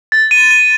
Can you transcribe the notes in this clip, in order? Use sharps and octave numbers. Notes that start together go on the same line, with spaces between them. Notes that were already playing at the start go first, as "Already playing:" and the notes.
A6
D#7
D#7